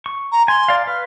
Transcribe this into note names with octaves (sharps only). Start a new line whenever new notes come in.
C#6
A#5
G#5 C6
D5 F5
B4 F6